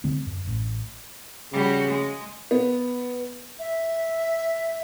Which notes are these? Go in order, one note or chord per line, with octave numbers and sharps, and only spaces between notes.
D3 G#3 C4
F#2
A1
C#3 G3 F#4
G#3
B3
E5